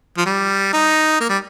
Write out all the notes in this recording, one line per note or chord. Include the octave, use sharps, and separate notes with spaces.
F3
G3
D#4
A#3
G3